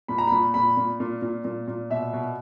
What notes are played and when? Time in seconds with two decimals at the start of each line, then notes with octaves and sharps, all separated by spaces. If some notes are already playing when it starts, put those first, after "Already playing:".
0.08 A#2 B5
0.18 A#5
0.27 A#2 B5
0.54 A#2 B5
0.77 A#2
1.00 A#2
1.22 A#2
1.45 A#2
1.68 A#2
1.90 B2 E5
2.13 B2